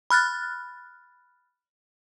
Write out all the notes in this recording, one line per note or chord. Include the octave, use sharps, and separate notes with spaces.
B5 F6 F#6 A6